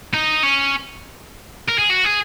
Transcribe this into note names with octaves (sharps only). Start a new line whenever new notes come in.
D#4
C#4
A#4
G#4
F#4
G#4